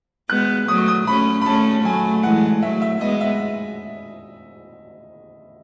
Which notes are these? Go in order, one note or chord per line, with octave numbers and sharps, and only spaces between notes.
G#3 B3 F#6
F#3 A3 D#6
C#6
D#6
A3 C#4 B5
B5
A3 C#4 A5
F#3 A3 G#5
E3 G#3 F#5
F#3 A3 E5
E5
G#3 B3 D#5
E5